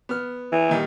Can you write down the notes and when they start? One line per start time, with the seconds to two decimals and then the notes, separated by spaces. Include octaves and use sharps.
0.09 B3 F6
0.52 E3
0.69 A#2 D#3 G3